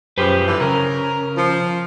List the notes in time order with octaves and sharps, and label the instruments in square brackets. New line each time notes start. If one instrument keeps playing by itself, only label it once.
[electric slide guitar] F#2 B4 C5 [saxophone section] C#3 F3 G4
[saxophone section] D3 E3
[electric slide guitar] C#3 [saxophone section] A#4
[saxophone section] F3